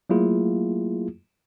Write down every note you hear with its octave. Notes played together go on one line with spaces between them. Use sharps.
F#3 A3 A#3 E4 F4 G#4